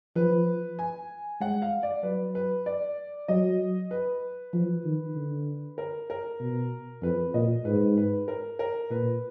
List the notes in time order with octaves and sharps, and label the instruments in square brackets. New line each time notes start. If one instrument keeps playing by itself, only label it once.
[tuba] F3 [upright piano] B4
[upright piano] G#5
[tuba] G#3 [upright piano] F#5
[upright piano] F5
D5
[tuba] F#3 [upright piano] B4
[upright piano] B4
D5
[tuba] F#3 [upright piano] D#5
[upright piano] B4
[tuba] F3
D#3
D3
[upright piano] A#4
A#4
[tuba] B2
[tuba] F2 [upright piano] B4
[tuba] A#2 [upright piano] D#5
[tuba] G#2 [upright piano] B4
[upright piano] B4
A#4
A#4
[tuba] A#2 [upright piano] B4